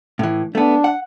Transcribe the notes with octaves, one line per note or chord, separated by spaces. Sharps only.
A2 E3
A3 B3 D4
F#5